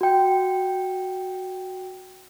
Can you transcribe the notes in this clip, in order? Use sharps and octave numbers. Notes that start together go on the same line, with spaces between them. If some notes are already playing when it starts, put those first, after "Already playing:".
F#4 G5